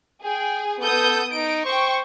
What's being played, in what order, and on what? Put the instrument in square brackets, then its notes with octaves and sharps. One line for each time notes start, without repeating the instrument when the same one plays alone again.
[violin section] G#4 [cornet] G5
[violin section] B3 D#6 G6 [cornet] A4
[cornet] D#4 [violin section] D7
[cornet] C5 [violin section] G5 C#6